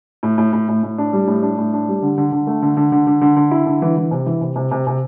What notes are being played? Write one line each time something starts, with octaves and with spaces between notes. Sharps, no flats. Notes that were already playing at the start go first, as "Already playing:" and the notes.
A2
A2
A2
A2
A2
D4
G3
A2
D4
A2
D4
G3
D3
D3
D3
A3
D3
D3
D3
D3
D3
D3
E4
D3
E3
E3
C3
E3
C3
C3
C3
C3